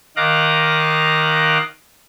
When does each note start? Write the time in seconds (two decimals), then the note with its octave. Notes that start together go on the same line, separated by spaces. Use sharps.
0.16 D#3 D#5 F5 D6 F#6 A#6